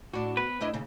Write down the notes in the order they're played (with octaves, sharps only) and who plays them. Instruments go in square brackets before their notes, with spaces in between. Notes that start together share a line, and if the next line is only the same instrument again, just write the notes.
[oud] A2 D4 [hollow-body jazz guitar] F#4
[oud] B3 [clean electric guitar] B4
[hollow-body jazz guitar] A2 [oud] D4 E4 D#5
[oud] D#2 C#3